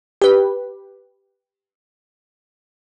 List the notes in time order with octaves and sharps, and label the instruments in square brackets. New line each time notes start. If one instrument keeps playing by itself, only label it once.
[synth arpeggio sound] G4 B4